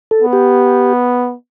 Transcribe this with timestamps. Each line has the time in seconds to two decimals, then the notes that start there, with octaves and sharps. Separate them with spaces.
0.11 A4
0.22 B3
0.33 G4